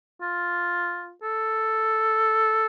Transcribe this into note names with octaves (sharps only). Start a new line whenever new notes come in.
F4
A4